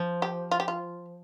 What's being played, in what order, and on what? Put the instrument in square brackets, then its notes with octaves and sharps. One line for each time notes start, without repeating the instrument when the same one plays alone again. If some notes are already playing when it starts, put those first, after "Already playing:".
Already playing: [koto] F3
[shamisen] G4
F4
G4
F4